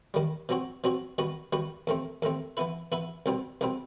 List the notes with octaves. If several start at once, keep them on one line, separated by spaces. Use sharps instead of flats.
D#2 D#3 G3
B2 F#3 C4 F#4
B2 F#3 C4 F#4
D#3 G3 B3 F#4
D#3 G3 B3 F#4
D#2 D#3 A3 C4
D#2 D#3 A3 C4
E3 B3 E4 B4
E3 B3 E4 B4
C2 B2 G3 C4
C2 B2 G3 C4